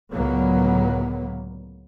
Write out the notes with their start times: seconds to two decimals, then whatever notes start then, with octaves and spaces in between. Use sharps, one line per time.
0.11 C#2 A2 D3 F#3 A#3 B3